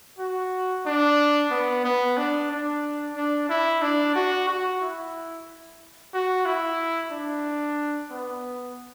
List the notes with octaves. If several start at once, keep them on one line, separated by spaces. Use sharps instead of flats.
F#4
D4
B3
B3
D4
D4
D4
E4
D4
F#4
F#4
E4
F#4
E4
D4
B3